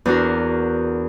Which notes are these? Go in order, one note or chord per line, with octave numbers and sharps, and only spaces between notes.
E2 D4 F#4 A#4